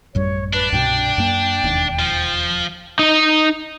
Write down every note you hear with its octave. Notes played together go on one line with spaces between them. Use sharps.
A1 F#2 G3 C#5
D4 B4
C2 G2 B2 G5
F#2 A#3
E1 D#2
F3
D#4 D#5